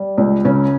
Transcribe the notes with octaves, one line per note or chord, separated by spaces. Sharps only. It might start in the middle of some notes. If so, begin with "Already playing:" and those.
Already playing: G3
C#2
C#3 C#4